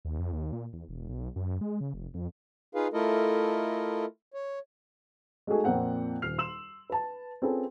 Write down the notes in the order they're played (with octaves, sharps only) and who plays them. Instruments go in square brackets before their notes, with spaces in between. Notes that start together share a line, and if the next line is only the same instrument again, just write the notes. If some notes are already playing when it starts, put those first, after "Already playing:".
[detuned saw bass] D#2
F2
D#2
A#2
E2
E1
B1
F#2
G#3
C#3
F1
F2
[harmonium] D#4 F4 G#4 B4 F5
A3 E4 F4 A4 A#4 D#5
C#5
[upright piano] G#3 A3 D#4 F#4 G#4 A4
F2 A#2 A#3 C4 F#5 G5
D#1 F6 C7 F7
C6 E6 E7 F#7
B4 A5
C4 C#4 F4 G#4 A4 B4